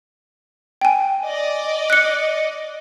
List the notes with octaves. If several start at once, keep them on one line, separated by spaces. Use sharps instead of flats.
G5 G#5
D5 D#5
F#6 C#7